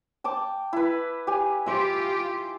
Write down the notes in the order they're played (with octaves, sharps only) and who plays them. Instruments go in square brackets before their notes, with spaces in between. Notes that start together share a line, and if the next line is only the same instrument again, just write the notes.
[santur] G5 A5 D6
E4 B4
G4 G#5
[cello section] F4 G4 [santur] C5 E5